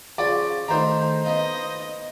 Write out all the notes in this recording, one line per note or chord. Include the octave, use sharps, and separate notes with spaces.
C#3 F3 C#4 D5
D#3 A3 D4 D#4 C5 A#5
B3 D#5 F5